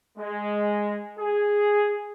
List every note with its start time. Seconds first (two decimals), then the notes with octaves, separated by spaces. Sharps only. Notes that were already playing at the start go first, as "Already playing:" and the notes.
0.18 G#3
1.18 G#4